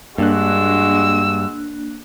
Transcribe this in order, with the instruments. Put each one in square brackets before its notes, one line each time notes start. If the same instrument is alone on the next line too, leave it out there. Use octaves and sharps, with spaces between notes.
[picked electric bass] G2 [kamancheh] G#3 F#4 [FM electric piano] A#3 D4 F#6 [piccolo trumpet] E6